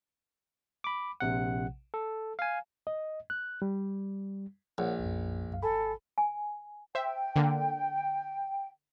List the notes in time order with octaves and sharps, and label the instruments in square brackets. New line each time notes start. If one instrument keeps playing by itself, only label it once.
[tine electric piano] B5 D6
A#1 C3 F#5
A4
F5 G#5
[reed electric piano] D#5
F#6
G3
[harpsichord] A#1 [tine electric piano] A#4 C#5 F#5
[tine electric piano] B1 F#2
C2 F#2 F5
[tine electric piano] G#1 G#5 B5 [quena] A4
[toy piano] G#5
[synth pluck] C5 E5 [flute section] G5
[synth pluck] D3 A#3